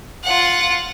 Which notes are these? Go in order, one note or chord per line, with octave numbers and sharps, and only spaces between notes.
F4 F#5